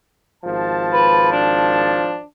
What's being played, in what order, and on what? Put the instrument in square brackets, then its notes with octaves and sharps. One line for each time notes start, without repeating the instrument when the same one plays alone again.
[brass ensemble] G#1 F3 A5
[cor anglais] B4
D4